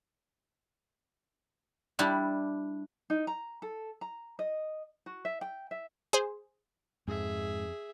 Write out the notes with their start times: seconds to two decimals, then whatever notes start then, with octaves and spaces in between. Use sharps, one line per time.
1.99 G3 D4 E4 G4
3.10 D#4
3.27 A#5
3.62 A4
4.01 A#5
4.39 D#5
5.06 F#4
5.25 E5
5.41 G5
5.71 E5
6.13 G#4 C5
7.08 F2 G#2 G#4 E5